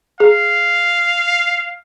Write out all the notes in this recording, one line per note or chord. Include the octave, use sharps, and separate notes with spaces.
G#4 F5